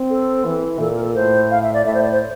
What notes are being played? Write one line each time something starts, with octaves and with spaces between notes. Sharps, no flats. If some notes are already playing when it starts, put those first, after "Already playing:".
Already playing: C4
A4
E3
A#2 A4
A#4
A4
A2 C5
F5
E5
D5
A2 E5
C5
D5
C5